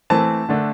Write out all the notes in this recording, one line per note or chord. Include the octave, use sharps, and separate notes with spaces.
E3 A3 C4 A5
D3 A3 D4